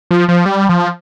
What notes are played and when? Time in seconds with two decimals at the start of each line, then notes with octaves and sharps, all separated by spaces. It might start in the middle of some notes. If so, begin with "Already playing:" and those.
0.11 F3
0.29 F3
0.46 G3
0.69 F3